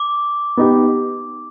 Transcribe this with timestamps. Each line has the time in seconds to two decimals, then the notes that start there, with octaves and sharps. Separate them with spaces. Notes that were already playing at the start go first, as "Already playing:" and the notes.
Already playing: D6
0.57 B3 D#4 G4